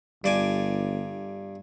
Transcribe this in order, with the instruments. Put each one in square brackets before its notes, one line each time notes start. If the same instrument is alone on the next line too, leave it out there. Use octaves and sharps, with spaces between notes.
[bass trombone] G1 [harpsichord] G2 D5 G#5